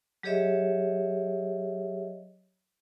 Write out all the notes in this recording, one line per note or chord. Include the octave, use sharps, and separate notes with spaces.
F#3 G4 G#4 C#5 D#5 E5